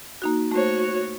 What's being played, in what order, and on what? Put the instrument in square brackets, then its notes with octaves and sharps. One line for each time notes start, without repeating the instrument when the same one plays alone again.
[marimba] A#3 D#4 F#4
[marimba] A3 C5 [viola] F#4 C#5